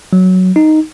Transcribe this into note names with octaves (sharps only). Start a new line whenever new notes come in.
F#3
D#4